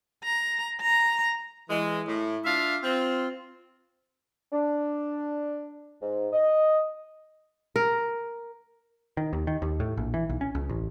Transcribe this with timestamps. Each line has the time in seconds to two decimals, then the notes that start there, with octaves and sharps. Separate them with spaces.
0.24 A#5
0.81 A#5
1.69 E3 G#3
2.07 A2
2.45 D4 F4 E5 F5
2.83 C4 F4
4.52 D4
6.01 G#2
6.32 D#5
7.76 A#4
9.17 D#3
9.33 D#2
9.47 D#3
9.62 D#2
9.80 A2
9.97 A#1
10.14 E3
10.29 B1
10.41 C#4
10.55 C#2
10.69 A1